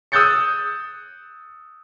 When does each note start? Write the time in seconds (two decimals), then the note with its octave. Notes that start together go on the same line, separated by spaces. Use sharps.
0.12 D#6 E6 F#6 G6 A6 C#7